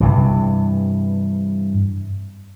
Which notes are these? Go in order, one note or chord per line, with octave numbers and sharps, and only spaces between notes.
G2 C3 E3